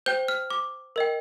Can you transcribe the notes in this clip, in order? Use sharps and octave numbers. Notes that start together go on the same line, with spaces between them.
C5 G5 G6
F6
D6
A#4 D#5 G5